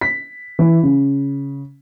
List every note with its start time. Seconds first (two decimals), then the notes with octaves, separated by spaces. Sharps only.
0.01 B6
0.59 E3
0.83 C#3